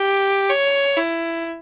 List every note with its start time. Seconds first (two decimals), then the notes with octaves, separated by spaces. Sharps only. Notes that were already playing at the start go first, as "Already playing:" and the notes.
Already playing: G4
0.50 C#5
0.97 E4